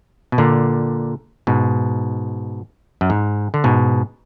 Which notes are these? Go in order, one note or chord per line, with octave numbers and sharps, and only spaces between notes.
B2
A#2 D3
G#2 B2
F#2
G#2
D3
G#2 B2